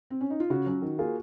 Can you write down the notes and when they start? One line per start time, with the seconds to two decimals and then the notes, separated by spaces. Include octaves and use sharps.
0.10 C4
0.21 C#4
0.30 D#4
0.40 F4
0.50 C#3 F#4
0.66 F#3 C#4
0.82 D#3
0.99 A#3 F4 G#4